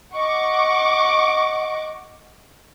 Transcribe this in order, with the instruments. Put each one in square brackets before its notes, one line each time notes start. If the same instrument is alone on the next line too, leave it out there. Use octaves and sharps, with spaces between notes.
[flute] D#5 [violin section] F#5 C#6 D6